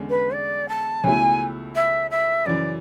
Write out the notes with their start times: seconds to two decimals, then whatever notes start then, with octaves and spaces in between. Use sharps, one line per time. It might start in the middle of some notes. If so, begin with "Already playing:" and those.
Already playing: E2 D3 G#3 C#4
0.09 B4
0.33 D5
0.68 A5
1.04 C#2 B2 A3 E4 G#5
1.75 E5
2.10 E5
2.46 F#2 C#3 E3 D5